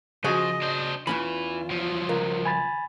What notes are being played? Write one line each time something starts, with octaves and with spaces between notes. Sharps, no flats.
C#3 F3 F#4 G#4 D#5
D4 C5
E2 E3 C#4 F4 B5
F3 F#3
C#2 A#4
G#5 B5 A6